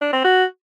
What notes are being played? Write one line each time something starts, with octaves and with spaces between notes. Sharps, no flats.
D4
C4
F#4